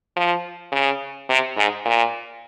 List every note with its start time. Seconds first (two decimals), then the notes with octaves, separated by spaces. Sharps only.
0.16 F3
0.72 C#3
1.29 C3
1.57 G#2
1.85 A#2